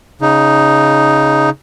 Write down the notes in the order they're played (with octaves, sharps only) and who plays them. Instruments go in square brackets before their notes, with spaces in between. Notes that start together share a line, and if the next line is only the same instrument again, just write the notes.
[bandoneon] C#3 D#4